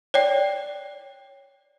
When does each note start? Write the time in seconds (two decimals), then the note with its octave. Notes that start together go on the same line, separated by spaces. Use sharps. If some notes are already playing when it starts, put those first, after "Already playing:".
0.14 C#5 D5 G5